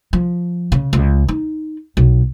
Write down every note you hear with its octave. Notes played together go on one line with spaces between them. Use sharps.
F3
C#3
C#2
D#4
B1